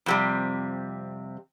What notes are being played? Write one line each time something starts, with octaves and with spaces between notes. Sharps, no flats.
F2 C3 G3